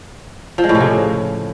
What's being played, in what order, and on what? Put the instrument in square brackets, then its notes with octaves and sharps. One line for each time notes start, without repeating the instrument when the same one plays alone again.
[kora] F3
G#3
A2
C3
C#3